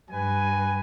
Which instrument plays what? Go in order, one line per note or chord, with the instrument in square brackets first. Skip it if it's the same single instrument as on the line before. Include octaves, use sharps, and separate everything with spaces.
[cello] G2 [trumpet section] B4 G#5